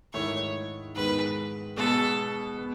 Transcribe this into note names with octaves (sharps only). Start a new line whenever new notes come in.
G#2 D#3 A3 E4 C#5
G#2 D#3 G#3 B3 B4
B2 G#3 B3 A4
B3